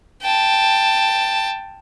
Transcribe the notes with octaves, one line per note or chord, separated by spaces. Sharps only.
G5 A5